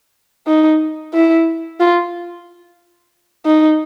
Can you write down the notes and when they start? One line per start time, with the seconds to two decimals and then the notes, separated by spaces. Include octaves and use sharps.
0.47 D#4
1.14 E4
1.80 F4
3.46 D#4